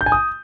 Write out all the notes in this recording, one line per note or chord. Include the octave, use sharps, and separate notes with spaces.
G6
G#5
D#6